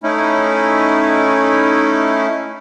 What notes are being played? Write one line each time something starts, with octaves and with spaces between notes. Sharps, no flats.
A3 C#4 D#4 E4